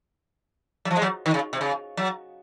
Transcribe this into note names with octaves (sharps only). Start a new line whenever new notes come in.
F#3
F3
G#3
F#3
D#3
C#3
C3
C#3
F#3